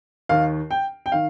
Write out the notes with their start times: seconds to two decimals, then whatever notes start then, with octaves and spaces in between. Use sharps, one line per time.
0.29 D#2 D#3 F5
0.71 G5
1.06 G5
1.12 D#3 F5